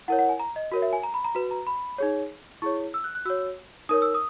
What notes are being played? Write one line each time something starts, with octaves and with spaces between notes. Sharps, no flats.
E4 A#4 C#5 F#5
F#5
G#5
A#5
D#5
F#4 A#4 C#5
E5
G#5
A#5
B5
A#5
F#4 B4
A#5
B5
D#4 G#4 C#5
E4 G#4 C#5 C#6
E6
F#6
F#6
F#4 C#5 E6
D#4 A#4 C#5 D#6
E6
D#6